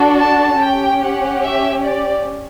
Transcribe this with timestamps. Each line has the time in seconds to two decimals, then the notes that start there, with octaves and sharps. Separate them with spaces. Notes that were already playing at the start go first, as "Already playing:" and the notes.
Already playing: D4 F#4 A4
0.19 A5
0.60 C#4 G4 G5
1.02 F#5
1.44 E5
1.85 D5